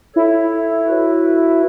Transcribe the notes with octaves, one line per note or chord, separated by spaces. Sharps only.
E4 A4 C#5
F#4 B4